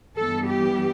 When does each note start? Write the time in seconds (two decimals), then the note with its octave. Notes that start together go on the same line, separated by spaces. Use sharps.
0.16 G2 E3 G3 B3 A4
0.46 G4